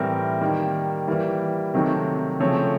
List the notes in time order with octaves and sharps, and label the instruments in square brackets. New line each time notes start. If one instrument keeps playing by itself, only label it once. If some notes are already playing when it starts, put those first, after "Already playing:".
Already playing: [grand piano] A2 E3 G3 C4 A#4
D#3 G3 A#3
E3 G3 A#3
C3 D#3 F#3 A3 C4
C#3 F3 A3 C4 C#5